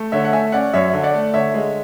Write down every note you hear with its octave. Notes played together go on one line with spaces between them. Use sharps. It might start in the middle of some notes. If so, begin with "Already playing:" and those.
Already playing: A3
D3 C#5 E5
F#5
A3 E5 G#5
C#4 D5 F#5
F#2 C#5 E5
D3
D5 F#5
A3
D3 C#5 E5
G#3